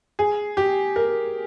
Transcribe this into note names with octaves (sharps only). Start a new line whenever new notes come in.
G#4
G4
A#4